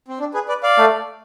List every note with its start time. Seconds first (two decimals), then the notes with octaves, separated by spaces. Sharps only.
0.08 C4
0.20 D4
0.34 G#4 B4
0.48 B4 D5
0.63 D5 F5
0.78 A3